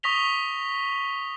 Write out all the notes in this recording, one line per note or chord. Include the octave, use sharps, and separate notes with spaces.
C#6 D#6 A#6 B6 F7 G7